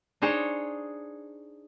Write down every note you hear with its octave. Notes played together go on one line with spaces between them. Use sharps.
D4 D#4 G#4 C5 C#5